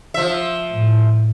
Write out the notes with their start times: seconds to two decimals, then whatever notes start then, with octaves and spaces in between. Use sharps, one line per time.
0.14 F3 E5
0.70 A2